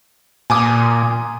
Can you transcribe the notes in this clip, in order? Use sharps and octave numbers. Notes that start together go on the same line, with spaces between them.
A#2 G#5 D6 D#6